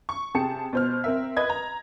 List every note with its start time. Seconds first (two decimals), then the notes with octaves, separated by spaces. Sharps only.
0.09 C#6
0.34 C3 G4 G#4 A5 C#7
0.73 B2 C5 F6
1.04 C4 A#4 E5
1.37 B4 D#5 B5 G#6
1.50 A#5